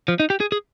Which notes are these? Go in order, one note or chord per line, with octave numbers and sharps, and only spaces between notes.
F3
D#4
G4
G#4
G#4